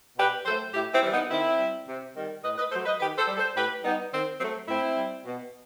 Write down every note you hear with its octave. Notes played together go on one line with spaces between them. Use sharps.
B2 G4 B4
F#3 A3 A4 C5
A2 E4 G4
C4 E4
E3 G3
B3 D#4
D#3 C4 E4
G3
C3
D#3 G3
A2 B4 D#5
B4 D#5
F#3 A3 A4 C5
B4 D#5
D#3 G4 B4
A4 C5
G3
A4 C5
A2 G4 B4
G3 B3 D#4
D#3 C4
F#3 A3 C4
A2 C4 E4
G3
B2